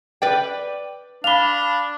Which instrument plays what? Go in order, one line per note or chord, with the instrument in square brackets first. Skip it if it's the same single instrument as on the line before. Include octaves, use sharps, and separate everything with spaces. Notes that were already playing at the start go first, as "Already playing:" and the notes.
[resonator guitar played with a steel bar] B4 D5 G5
[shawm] D4 [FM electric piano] F5 B5 [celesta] F7 G7